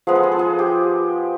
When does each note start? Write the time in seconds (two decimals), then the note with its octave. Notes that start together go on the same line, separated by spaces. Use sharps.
0.07 F3 G#3 B3 G#4
0.15 A4
0.23 G#4
0.32 A4
0.39 G#4
0.59 G4